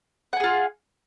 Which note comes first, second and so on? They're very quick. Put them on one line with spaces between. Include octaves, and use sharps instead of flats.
F#5 G#5 G#4 F4